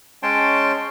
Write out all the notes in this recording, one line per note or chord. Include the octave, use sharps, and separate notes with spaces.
G#3 C#4 C#5 G5 A5 C6